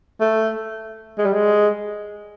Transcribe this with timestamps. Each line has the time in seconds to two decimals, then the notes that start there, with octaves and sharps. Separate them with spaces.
0.21 A3
1.18 G#3
1.25 G3
1.33 G#3